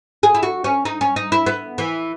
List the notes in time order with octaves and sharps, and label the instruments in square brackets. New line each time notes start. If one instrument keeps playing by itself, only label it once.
[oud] G#4
E4
F#4
C#4
D#4
C#4
D#4
E4
B3
E3